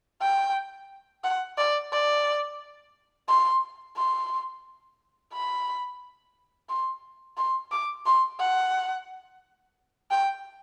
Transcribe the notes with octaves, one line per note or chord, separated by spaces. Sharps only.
G5
F#5
D5
D5
C6
C6
B5
C6
C6
D6
C6
F#5
G5